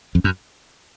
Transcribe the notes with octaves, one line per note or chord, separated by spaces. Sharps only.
F2
F#2